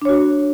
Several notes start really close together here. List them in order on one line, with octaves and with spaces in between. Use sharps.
D4 C#5 F#4